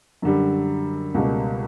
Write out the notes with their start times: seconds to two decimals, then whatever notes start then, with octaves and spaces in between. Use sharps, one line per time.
0.22 F#2 D3 G3
1.14 C#2 B2 G3 A#3